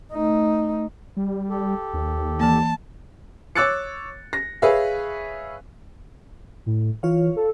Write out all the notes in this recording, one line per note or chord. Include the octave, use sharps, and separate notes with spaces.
A3 D#4
G3
G4 A4
D#2
E3 A#3 A5
C#5 D6 E6 F#6 A6 C#7
A#6
G#4 B4 C#5 E5 F5
A2
E3 F4 C#5 F5
A4